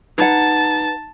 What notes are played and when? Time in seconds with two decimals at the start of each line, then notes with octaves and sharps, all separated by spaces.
0.18 D#4 B4 F#5 A5